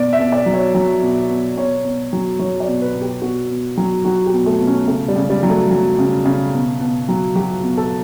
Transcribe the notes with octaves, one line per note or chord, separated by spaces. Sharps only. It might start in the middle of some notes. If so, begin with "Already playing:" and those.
Already playing: B2 D5
E5
B2
D5
F#3
C#5
F#3
B2
B2
B2 C#5
B2
F#3
F#3 C#5
D5
B2
B4
B2
G4
B2 F#4
B2
F#3
F#3 F#4
G4
B2
A3
B2
C#4
C#3 A3
G3
C#3
G3
F#3
A3
F#3
C#3
C#3
B2
B2
F#3
F#3 G4
B2
A4